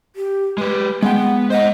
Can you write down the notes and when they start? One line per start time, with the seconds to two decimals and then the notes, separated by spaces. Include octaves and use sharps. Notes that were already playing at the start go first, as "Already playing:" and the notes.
0.16 G4
0.58 G#3 G4 B4
1.03 G#3 B3 F#5 G5
1.50 C5 D#5 F#5